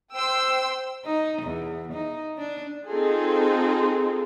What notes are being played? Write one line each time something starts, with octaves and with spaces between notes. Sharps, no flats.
C5 G5 C6 E6
D#4
E2
D#4
D4
C4 D#4 F4 G#4 A4